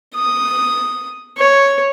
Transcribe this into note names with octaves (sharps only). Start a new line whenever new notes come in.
D#6
C#5